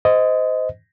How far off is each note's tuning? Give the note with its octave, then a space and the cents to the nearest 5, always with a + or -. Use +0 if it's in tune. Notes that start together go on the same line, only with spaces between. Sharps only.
C5 -25 D#5 +10